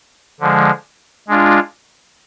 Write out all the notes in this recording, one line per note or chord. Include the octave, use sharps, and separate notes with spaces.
D3 F3 G#3
G#3 D4 F4